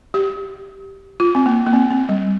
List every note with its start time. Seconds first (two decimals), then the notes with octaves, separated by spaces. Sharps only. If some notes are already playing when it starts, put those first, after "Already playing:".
0.14 G4
1.20 F4
1.35 C4
1.46 A#3
1.66 A#3
1.73 C4
1.91 C4
2.09 G3